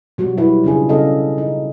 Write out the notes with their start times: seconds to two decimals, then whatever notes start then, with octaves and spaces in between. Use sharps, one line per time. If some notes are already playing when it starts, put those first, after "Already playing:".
0.18 B2 F#3 G3 F#4
0.37 F#3 G3 E4 B4
0.64 C#3 D4 F4 G#4
0.89 C#3 B3 C#4 A4 D#5 F5
1.38 D#4